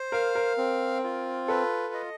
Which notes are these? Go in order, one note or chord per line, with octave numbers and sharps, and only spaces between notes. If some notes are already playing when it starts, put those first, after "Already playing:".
Already playing: C5
A#4 F5
A#4
C4
F4
A4 B4
D#5